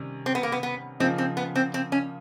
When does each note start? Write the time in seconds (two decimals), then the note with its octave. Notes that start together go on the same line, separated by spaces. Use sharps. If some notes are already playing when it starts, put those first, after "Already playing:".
Already playing: C3 D#3 G3 C#4
0.26 C4
0.35 B3
0.43 A#3
0.52 B3
0.63 B3
1.00 C#3 F3 A#3 C4 D#4
1.18 C4
1.37 B3
1.56 C4
1.74 C4
1.92 C#4